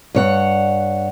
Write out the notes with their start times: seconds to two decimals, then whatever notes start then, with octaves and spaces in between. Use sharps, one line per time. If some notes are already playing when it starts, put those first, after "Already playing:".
0.15 G2 C#5 F#5